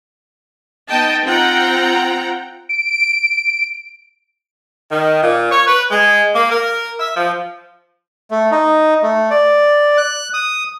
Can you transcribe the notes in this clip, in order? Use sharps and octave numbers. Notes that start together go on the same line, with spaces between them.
B3 D#4 D#5 G5 A5
C4 F4 F#5 G5 A#5
D7
D#3
A#2
C#5
B4
G#3
A#3
A#4
E5
F3
A3
D#4
A3
D5
F#6
D#6